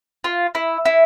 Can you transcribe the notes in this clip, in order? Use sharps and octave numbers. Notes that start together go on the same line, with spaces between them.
F4
E4
E4